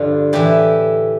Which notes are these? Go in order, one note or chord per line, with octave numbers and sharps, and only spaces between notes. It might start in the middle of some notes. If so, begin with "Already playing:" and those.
Already playing: G2 D3 F3 F4
A2 E3 G4